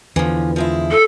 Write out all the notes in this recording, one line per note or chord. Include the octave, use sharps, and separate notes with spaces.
E2 D3 E3 F3
F3 G#3 E4
A4